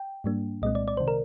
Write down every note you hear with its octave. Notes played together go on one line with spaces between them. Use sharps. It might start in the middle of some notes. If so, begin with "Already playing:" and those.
Already playing: G5
G#2 G3 A#3 D4
C2 A#2 G#3 C4 D#5
D5
D5
C3 D#3 C5
A#4